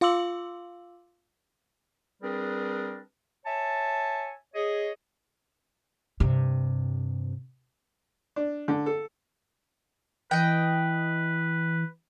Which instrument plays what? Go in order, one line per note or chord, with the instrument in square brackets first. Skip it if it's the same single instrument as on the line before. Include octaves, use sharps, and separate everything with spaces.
[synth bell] F4 F5 C6 D6 E6 F#7
[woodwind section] G3 C4 D4 G#4 A#4 B4
C#5 E5 G#5 A5
G#4 C#5 D#5
[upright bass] G2 C3
[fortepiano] D4
D3
A4
[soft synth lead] E3 [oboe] B4 [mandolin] D#5 G5